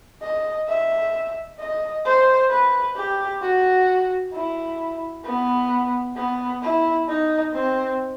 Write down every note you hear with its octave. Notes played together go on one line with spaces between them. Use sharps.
D#5
E5
D#5
C5
B4
G4
F#4
E4
B3
B3
E4
D#4
C4